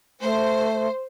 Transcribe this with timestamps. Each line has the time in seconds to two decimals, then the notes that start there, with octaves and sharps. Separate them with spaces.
0.21 A3 C5